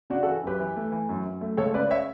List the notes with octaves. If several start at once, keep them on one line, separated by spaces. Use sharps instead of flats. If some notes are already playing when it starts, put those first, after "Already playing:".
C#3 D4 F#4
F#4 A4
E3
F#2 G4 B4
E3
A3
E3
F#2
F#2
A3
C#2 A4 C#5
C#3 B4 D5
C#5 E5